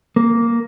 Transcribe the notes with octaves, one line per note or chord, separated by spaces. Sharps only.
A#3